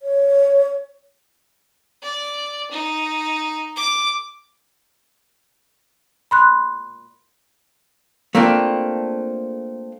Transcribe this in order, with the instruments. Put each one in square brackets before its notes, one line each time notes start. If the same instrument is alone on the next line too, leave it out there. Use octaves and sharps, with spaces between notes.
[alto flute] C#5
[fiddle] D5
D#4
D6
[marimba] B5 C6 F#6
[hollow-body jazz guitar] A3 A#3 C4 D4 F4